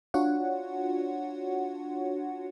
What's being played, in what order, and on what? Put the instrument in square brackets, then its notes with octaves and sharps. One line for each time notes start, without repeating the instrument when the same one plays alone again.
[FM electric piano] D4 F4 F#4 C#5 F#5